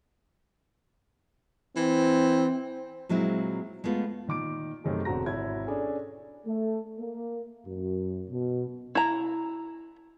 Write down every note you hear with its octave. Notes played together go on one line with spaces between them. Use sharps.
E3 C4
A#2 F#3 G#3 C4 E4
G#3 A3 B3 F4
A#2 D#3 D6 D7
F#2 C3 D#3 A3 D#4 G#4
E1 D3 C4 F#4 A#5 A#6
G#1 E4 F#4 C#5 G#6
C#4 D4 G#4 A4
A3
A#3
F#2
B2
E4 A#5